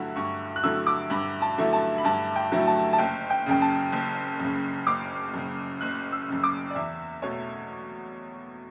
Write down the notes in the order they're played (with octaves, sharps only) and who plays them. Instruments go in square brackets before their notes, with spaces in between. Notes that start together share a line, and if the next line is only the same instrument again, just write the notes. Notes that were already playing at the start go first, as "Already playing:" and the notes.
Already playing: [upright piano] G2 D3 F#3 A3 E4 E5 F#5
G2 C#6
F#6
D3 F#3 A3 E4 E6
D6
G2 B5
A5
D3 F#3 A3 E4
A5
B5
G2 A5
G5
D3 F#3 A3 E4
A5
A5
F#1 G5
G5
F#2 C#3 G5
A5
F#1
F#2 C#3
F#1 D6
F#2 C#3
F#1 F#6
E6
F#2 C#3
D6
D5
E2 E5
B2 A3 C#5